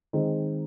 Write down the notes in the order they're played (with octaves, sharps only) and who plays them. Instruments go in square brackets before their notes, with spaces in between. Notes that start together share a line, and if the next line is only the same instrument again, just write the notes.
[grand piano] D#3 G#3 C4 D#4